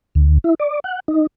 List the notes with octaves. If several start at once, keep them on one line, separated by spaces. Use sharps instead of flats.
D2
E4
D5
F#5
D#4